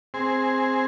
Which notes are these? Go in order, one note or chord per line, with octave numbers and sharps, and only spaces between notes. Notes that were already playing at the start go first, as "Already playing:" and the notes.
C4 G#4